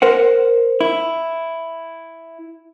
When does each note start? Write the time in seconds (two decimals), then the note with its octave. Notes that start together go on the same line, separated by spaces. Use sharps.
0.02 A#4 C5 F#5
0.81 E4